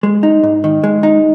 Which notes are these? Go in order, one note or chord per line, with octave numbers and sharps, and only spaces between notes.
G#3
D#4
G#2
D#3
G#3
D#4